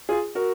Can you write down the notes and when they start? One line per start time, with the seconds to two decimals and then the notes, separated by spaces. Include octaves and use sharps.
0.09 F4 G#4
0.35 F#4 A#4